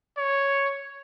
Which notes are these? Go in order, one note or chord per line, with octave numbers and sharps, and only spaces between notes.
C#5